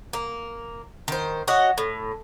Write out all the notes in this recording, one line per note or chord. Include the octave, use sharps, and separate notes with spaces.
A#3
D#3 C5
F#4 C#5 D#5 F#5
A2